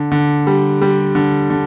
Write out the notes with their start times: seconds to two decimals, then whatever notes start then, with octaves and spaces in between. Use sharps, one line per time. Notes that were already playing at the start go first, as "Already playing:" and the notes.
Already playing: D3
0.12 D3
0.47 G3
0.82 G3
1.15 D3
1.50 D3